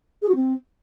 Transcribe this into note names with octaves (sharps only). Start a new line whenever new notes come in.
G#4
F#4
C4